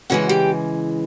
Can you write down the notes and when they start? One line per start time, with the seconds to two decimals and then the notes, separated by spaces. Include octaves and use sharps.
0.10 C#3 E3 G#3 F#4 F#5
0.29 G4 G5